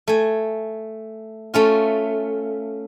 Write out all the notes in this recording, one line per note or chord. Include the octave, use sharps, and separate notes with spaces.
A3 G#5
A3 C#4 F4